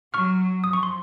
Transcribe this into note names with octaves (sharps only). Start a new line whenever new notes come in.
F#3 C#6 F6
F3 D#6
C#6
C6